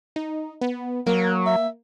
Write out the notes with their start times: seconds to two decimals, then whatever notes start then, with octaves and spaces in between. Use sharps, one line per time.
0.16 D#4
0.61 B3
1.07 F#3 A#3 A#4
1.46 E5